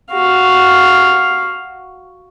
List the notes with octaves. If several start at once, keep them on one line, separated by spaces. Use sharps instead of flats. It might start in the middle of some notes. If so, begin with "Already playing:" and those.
F#4 F5